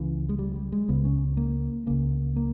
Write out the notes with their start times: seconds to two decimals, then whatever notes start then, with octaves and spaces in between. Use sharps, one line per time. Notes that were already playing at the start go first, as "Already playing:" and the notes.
Already playing: C#2 C#3 E3
0.29 G#3
0.39 G3
0.56 G3
0.72 G#3
0.89 C#2 C#3 B3
1.05 C#4
1.37 A#3
1.87 C#2 C#3 A#3
2.36 A#3